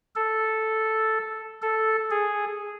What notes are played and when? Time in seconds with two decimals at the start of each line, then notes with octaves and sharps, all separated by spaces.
0.16 A4
1.62 A4
2.11 G#4